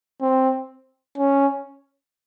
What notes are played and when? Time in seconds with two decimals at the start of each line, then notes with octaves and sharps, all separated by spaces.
0.21 C4
1.18 C#4